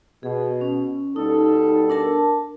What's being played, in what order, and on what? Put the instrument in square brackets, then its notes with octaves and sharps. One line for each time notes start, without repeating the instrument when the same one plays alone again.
[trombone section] B2 [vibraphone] G#4
[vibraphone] C#4
[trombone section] B2 G3 A4 [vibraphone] D#4
[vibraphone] D4 A#4 A5